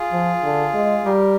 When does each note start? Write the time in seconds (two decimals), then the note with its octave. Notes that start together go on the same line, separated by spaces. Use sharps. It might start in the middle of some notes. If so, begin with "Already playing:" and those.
Already playing: F4 G#4
0.12 F3
0.43 D3
0.74 G#3
1.05 G3 G4 A#4